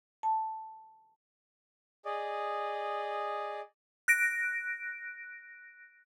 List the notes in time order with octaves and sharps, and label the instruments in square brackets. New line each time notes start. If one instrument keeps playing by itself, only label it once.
[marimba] A5
[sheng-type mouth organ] G#4 D5 D#5
[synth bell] F#6 A#6 D7